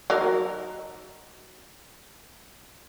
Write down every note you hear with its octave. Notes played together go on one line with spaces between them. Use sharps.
F#3 D#4 A#4